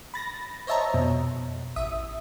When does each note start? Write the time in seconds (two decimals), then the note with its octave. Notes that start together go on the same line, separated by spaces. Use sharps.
0.14 B5 A6 A#6
0.67 C5 C#5 D#5 E5 A5 A#5
0.94 F2 B2
1.76 A1 E5 D#6